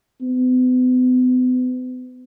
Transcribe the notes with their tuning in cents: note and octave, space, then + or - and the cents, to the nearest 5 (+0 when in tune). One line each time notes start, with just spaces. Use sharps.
B3 +40